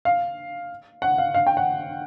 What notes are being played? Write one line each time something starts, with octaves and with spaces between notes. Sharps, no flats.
F5
F#5
F5
F5
G5
F#5